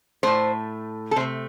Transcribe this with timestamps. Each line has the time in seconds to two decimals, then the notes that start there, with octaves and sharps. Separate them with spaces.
0.23 A2 A3 C5
1.11 A4
1.16 C3 C5
1.20 A3